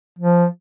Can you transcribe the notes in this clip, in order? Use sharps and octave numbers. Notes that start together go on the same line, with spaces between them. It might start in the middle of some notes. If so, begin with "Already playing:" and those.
F3